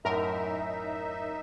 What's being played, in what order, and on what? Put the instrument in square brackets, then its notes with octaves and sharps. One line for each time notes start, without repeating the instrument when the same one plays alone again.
[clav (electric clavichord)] F#2 A2 [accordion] D#4 E5 [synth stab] A#4